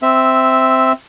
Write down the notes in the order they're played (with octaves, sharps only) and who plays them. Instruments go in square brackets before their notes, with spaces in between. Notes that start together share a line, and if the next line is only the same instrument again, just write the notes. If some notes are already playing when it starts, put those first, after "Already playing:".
[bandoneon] C4 E5